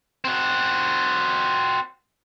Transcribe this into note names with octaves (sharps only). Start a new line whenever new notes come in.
C4 F#4